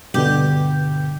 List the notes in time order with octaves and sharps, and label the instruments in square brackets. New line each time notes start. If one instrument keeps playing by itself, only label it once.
[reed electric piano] G2 B2 D3 [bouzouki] G4